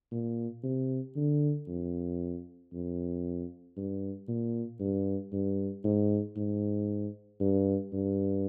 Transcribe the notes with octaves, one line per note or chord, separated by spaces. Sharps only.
A#2
C3
D3
F2
F2
G2
A#2
G2
G2
G#2
G#2
G2
G2